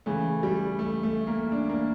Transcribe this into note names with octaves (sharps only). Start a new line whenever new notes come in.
C#3 E3 A3
G3
A3
A3
A#3
D4
A#3